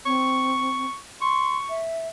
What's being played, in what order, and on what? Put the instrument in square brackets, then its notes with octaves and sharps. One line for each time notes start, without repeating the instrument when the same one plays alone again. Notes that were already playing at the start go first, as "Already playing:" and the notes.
[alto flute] C4 [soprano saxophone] C#6
[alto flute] C6 [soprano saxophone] C#6
[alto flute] E5